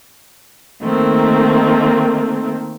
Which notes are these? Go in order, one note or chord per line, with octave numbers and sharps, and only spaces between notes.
D#3 A3 A#3 C4